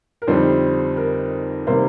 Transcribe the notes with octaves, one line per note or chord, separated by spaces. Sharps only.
A#4
F2 D3 G3 C4 D#4 C5
A#4
C3 D#3 G3 A#3 C5